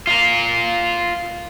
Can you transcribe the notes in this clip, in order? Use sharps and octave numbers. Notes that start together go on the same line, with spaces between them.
F4 A#4